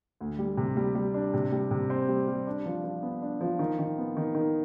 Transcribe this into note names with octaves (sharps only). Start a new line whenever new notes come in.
D2
G3
C3
G3
G3
D4
C3
G3
C3
C4
G3
G3
D4
F3
F3
B3
D4
F3
D#3
D#3
B3
D#3
D#3